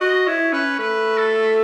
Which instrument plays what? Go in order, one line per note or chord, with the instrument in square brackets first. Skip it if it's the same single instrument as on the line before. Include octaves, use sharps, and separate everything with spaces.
[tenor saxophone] F#4 [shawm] D#5
[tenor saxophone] E4 [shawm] C#5
[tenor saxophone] C#4 [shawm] B4
[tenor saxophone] A3 [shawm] B4
[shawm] A4